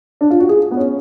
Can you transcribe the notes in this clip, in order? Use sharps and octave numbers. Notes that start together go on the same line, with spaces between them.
D4
F4
F#4
G#4
B3
C#4